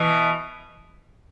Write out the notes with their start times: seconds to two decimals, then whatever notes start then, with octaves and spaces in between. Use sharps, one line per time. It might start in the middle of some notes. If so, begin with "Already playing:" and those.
Already playing: B2 E3